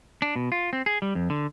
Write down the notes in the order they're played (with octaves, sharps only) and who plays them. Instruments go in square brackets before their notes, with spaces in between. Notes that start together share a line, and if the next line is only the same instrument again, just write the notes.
[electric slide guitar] D4
B2
F4
C4
G#4
G3
F2
D3